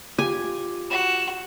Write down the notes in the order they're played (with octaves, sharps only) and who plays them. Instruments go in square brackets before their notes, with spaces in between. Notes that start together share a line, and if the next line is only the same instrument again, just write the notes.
[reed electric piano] F4 G4 D6 [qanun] G#5
[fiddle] F#4 [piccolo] E7